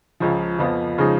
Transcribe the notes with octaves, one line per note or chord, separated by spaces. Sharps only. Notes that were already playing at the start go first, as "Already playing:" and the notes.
C#2 C#3 F3
F2 F3 B3 F4
C#3 F3 G#3 D#4